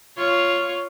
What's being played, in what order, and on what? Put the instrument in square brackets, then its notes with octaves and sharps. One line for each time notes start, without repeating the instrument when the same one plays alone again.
[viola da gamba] F4 C#5